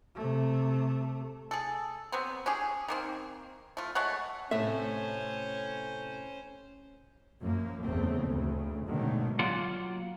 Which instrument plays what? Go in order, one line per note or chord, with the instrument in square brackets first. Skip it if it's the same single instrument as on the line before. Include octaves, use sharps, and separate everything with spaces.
[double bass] C3 A3
[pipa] G#4 A4
F#3 B3 C4
C#4 D4 G4 G#4
D#3 A#3 C4
A3 F4
G#3 A3 C#5 F#5
[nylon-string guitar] A2 C3 A3 [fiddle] C#4 C5 [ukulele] E5
[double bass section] F#2 F3 A#3
F#1 E2 C#3 A3 C4
D2 C#3
G#2 B2 D3 D#3 F#3 A3
[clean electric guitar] F#3 A#3 F4 F#5